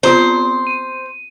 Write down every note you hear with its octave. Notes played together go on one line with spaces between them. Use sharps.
B3 C4 F4 C5
D#7